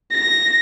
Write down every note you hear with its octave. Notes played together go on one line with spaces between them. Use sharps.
A#6